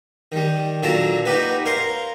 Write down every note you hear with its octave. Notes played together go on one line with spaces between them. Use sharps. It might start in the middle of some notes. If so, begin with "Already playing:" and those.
D#3 G3
A#2 D3 F#3 F#4 A5 A#5
D#4 F#4 G4 B4
A#4 C#5 F5 C6